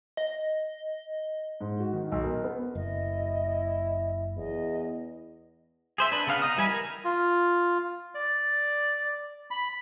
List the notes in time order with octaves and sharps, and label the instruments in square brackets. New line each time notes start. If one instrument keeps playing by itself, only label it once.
[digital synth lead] D#5
[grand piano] G#2
F#4
D#3
B1
A#4
B3
[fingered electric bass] F#1 [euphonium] E4 [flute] D#5
[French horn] E2 [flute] D#5
[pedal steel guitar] G#4 C5 E5
D4 B4
C#3 B3 F5 F#6
D#4 D#6
E3 G3 G#5 B5
A#4
[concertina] F4
D5
B5